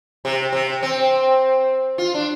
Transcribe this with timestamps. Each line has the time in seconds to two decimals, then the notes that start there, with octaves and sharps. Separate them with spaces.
0.25 C3
0.53 C3
0.83 C4
1.98 F4
2.14 D4